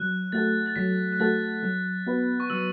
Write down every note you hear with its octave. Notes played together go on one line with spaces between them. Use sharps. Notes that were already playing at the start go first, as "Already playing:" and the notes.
Already playing: F#3 F#6
A3 F#4 A4 A6
A6
F#3 B6
F#6
A3 F#4 A4 A6
F#3
B3 F#4 B4
C#6
F#3 E6